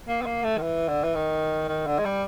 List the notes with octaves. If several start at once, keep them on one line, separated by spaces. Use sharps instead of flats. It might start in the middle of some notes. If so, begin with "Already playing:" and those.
A#3
B3
A#3
A3
D#3
E3
D3
E3
D#3
D#3
D3
G#3
G3